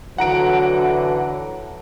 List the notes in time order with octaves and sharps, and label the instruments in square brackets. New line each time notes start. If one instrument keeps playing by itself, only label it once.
[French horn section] D3 E3 F#3 [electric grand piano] F#5 A#5 D7